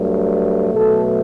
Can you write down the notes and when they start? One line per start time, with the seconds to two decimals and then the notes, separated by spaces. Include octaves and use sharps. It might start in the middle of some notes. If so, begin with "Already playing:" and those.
Already playing: G2 F#3 A3
0.74 B2 F#3 A3 A4